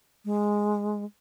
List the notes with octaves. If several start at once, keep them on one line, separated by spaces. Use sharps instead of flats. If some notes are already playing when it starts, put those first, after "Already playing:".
G#3